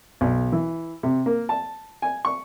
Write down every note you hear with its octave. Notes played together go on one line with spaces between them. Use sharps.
B1
E3
C3
A#3
A5
G#5
C#6